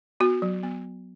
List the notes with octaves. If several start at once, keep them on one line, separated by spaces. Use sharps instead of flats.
B3 F#4
F#3
B3